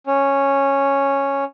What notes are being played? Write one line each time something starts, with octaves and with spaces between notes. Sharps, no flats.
C#4